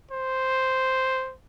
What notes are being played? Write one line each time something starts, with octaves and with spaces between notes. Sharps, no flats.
C5